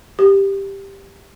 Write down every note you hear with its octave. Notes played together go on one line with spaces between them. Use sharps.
G4